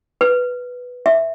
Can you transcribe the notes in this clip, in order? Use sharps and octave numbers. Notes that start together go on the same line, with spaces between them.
B4
E5